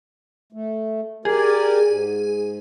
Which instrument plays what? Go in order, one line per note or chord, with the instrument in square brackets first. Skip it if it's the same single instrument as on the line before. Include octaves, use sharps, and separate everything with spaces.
[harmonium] A3
[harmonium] G4 A#4 D5 [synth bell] G#4
[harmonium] G#2